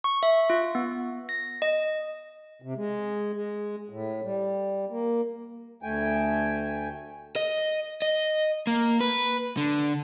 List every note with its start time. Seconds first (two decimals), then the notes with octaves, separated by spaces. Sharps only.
0.04 C#6
0.23 E5
0.50 F4
0.75 B3
1.29 A#6
1.62 D#5
2.62 C3
2.76 G#3
3.33 G#3
3.89 A2
4.24 G3
4.90 A#3
5.83 D2 A3 G5 G#5
7.36 D#5
8.02 D#5
8.67 A#3
9.01 B4
9.57 D3